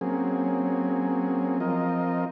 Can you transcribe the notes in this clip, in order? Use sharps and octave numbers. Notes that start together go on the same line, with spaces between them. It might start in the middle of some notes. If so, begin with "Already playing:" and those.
F#3 A#3 C4 C#4 G#4
F3 C4 F4 A#4 D#5